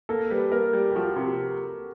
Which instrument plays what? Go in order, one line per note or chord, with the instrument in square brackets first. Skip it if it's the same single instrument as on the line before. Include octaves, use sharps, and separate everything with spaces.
[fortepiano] A#3 [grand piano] A4
[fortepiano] G3 [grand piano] B4
[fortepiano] A#3 [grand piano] A#4
[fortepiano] G3
[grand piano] G4
[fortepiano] F3 [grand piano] F#4
[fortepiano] C3